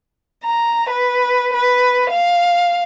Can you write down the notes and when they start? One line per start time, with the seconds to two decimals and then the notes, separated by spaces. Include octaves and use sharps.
0.45 A#5
0.90 B4
1.53 B4
2.11 F5